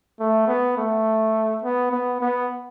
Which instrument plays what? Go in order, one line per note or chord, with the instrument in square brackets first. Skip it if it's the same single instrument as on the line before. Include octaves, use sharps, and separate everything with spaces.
[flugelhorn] A3
B3
A3
B3
B3
B3